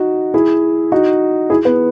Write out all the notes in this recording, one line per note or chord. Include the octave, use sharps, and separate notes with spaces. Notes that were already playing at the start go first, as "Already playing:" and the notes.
Already playing: D#4 F#4
E4 G#4
D#4 F#4
E4 G#4
B3